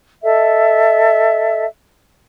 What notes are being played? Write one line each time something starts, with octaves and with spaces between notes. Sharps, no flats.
A4 D#5 E5